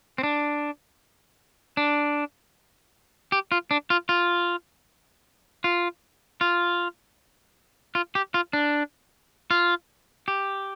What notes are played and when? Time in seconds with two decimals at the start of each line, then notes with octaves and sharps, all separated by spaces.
0.18 C4
0.23 D4
1.77 D4
3.32 G4
3.52 F4
3.71 D4
3.90 F4
4.09 F4
5.64 F4
6.41 F4
7.95 F4
8.15 G4
8.34 F4
8.53 D4
9.51 F4
10.28 G4